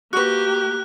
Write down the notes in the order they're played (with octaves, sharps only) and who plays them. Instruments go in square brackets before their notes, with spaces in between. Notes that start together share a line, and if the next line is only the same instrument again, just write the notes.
[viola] A#3 G4 [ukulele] F#4 B4 [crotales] F#6